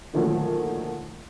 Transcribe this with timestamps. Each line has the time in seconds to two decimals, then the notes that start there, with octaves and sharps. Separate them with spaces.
0.13 A#2 D3 D#3 F3 F#3 A3